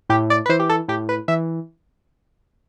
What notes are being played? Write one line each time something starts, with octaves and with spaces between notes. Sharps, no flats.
A2 G4
D5
B4
E3 C5
G4
A4
A2 G4
B4
E3 E5